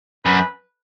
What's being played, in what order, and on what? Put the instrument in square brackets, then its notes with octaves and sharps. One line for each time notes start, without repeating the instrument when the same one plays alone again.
[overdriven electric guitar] F#2 [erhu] B4